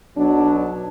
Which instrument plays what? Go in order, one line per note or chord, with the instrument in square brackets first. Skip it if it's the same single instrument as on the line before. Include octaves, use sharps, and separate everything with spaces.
[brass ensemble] B1 B2 F#3 D4